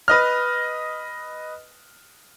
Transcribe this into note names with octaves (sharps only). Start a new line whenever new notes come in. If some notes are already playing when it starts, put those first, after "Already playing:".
B4 D#5 F6